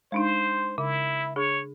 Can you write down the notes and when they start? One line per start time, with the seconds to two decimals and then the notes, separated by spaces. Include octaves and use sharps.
0.12 G#3 D4 D#4 C5
0.78 C#3 E4
1.36 D4 G#4 C#5